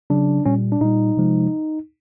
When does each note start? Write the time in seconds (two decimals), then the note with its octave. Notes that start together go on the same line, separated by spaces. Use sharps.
0.10 C#3 F#3 D4
0.46 A#2 G3 C#4
0.72 D4
0.81 A#2 G3 D#4
1.17 C3 F3 G#3